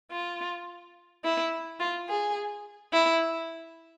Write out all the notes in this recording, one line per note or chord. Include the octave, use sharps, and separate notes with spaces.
F4
E4
F4
G#4
E4